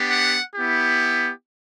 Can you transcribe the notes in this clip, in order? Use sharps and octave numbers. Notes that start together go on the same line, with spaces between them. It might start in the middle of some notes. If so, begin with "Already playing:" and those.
Already playing: B3 D4 G4
F#5
B3 E4 G4